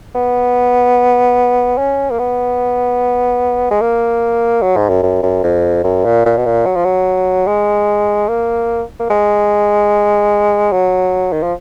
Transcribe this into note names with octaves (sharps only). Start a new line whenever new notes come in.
B3
C#4
A#3
B3
G#3
A#3
F#3
G#2
F#2
F#2
F#2
F2
F#2
A#2
A#2
B2
A#2
F#3
F3
F#3
G#3
A#3
A#3
G#3
F#3
D#3
F3